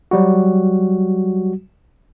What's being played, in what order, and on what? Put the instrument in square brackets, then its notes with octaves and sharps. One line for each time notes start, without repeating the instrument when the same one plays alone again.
[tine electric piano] F#3 G3 F#4